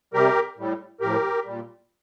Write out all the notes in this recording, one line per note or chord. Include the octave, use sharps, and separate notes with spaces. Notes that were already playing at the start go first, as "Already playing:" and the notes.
C3 G3 G4 A#4
A2 G3
A2 F3 G4 A#4
A#2 G3